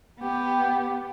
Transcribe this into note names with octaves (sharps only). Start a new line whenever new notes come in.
B3 G4